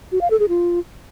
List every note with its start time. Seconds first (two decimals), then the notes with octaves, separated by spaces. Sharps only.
0.12 F#4
0.21 F5
0.30 A4
0.40 G#4
0.49 F4